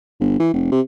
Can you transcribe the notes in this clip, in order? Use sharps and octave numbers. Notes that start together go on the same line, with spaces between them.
G1
E3
F1
C3